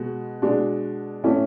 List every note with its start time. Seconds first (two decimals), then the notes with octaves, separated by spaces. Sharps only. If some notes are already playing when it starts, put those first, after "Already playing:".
Already playing: B2 G#3 F#4
0.42 B2 G#3 D4 F#4
1.24 A2 E3 A3 C#4